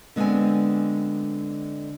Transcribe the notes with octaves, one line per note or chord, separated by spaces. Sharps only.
D3 G#3 B3 C4 G#5